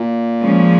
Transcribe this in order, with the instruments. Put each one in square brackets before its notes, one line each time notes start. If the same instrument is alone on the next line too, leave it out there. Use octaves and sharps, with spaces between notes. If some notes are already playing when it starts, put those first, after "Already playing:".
Already playing: [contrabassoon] A#2
[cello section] F3 G#3 C#4